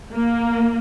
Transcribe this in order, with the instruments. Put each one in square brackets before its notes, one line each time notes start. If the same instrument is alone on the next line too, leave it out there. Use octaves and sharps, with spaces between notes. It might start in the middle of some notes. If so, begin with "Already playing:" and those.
[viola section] A#3